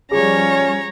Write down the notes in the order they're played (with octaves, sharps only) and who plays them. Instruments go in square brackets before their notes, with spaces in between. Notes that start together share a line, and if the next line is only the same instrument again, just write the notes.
[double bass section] F3 G3 [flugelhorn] C#4 [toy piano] G#4 [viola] C#5 A#5